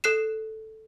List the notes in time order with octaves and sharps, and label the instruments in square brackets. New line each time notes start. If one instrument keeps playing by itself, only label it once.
[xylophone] A4 F#6 C7 E7